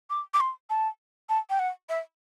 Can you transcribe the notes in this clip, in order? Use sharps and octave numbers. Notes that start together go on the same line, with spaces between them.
D6
D6
C6
A5
A5
G5
F#5
E5